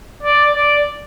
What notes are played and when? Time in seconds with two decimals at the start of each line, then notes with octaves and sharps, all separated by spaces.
0.23 D5
0.54 D5